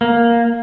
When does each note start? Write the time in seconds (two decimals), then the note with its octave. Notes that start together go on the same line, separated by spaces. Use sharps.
0.01 A#3